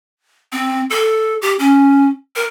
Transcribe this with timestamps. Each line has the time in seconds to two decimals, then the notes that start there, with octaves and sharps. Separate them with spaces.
0.52 C4
0.90 A4
1.42 G4
1.59 C#4
2.36 A#4